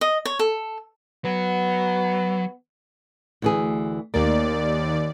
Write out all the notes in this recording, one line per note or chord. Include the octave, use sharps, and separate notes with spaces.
D#5
C#5
A4
F#3 B3
D2 E3 G#4
D#2 A#3 D5